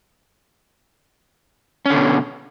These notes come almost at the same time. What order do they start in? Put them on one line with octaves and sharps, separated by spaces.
C#4 D3 B2